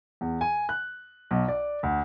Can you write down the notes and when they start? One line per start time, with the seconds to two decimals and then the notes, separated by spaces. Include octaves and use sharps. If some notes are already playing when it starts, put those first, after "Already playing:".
0.21 E2
0.41 G#5
0.69 F#6
1.31 B1
1.48 D5
1.83 D2